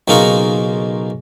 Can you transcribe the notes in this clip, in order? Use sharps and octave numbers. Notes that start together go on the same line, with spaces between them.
B1 C#3 A#3 D#4 F4 C#6